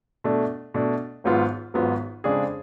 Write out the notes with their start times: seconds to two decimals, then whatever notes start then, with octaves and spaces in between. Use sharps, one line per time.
0.24 B2 A3 D4
0.74 B2 A3 D4
1.24 G#1 G#2 F#3 B3 F4
1.74 G#1 G#2 F#3 B3 F4
2.24 F2 C#3 G#3 D4 G#4